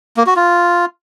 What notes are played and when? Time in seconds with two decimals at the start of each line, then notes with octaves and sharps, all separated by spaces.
0.17 A#3
0.26 F#4
0.36 F4